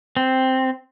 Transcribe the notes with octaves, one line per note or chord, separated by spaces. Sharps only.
C4